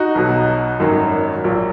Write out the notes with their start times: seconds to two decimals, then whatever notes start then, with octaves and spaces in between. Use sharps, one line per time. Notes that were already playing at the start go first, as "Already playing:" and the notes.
Already playing: D#4 F#4
0.15 B1 B2 F#3
0.80 G#1 F#2 D#3 F#3
1.44 A#1 A#2 F#3